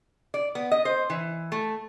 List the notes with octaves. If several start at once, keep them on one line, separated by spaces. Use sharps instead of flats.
D5
B3
D#5
C5
E3
A3